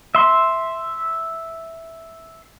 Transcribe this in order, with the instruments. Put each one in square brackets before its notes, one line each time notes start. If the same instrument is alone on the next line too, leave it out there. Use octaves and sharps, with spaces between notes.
[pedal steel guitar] E5 C6